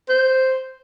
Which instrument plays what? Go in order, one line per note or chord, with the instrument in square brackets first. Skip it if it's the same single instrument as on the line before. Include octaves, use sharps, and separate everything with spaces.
[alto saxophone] C5